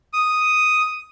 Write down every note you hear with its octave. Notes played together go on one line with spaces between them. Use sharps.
D#6